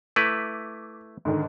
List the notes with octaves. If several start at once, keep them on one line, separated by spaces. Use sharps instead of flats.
A3 E4 B4 D6
G#2 D3 D#3